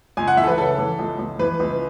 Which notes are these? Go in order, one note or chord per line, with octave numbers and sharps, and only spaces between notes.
C#2 G#5
F#5
E3 E5
A4
B4
C#3 A4
E3
C#2
C#2
E3 B4
C#2